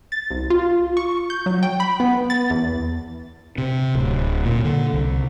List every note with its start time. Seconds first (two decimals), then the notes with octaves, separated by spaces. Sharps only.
0.12 A6
0.30 C2
0.50 F4
0.97 C#6
1.30 G6
1.46 F#3
1.63 G5
1.80 B5
2.00 B3
2.30 A6
2.50 E2
3.58 C3
3.95 D1
4.45 A#2
4.64 D3
4.93 C2